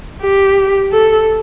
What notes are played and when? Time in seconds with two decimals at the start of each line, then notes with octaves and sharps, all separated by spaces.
0.22 G4
0.92 A4